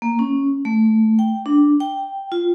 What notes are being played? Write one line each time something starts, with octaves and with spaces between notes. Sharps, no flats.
A#3
C#4
A3
G5
D4
G5
F4